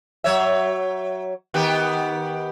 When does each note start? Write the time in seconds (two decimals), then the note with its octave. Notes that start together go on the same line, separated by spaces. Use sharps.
0.24 F#3 C#5 E5
1.54 D#3 B3 G4